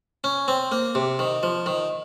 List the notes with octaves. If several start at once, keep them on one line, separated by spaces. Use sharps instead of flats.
C#4
C4
A#3
C3
D#3
F3
D#3